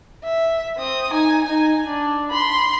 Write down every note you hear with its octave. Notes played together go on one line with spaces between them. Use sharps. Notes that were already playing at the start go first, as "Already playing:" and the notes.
E5
C4 D#6
D#4 G#5
D#4 G#5
D4
B5 C6